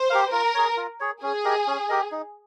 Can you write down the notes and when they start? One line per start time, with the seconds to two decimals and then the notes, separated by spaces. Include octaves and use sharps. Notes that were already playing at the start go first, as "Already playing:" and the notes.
Already playing: C5
0.10 G4 A#4 F5
0.32 F4 A#4
0.55 G#4 C#5
0.77 F4
1.00 G#4 C#5
1.22 C#4 G#4
1.45 G4 A#4 D#5
1.67 C#4
1.89 G4 A#4 D#5
2.12 D#4